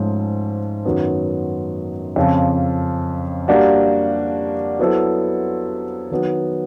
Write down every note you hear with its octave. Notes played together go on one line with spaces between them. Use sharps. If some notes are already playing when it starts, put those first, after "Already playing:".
Already playing: G#2 F3 A3 C#4
F#2 D#3 F#3 B3
F2 C#3 F3
G3 A#3 D4 F#4
F#3 B3 E4 A4 C5
D#3 F#3 B3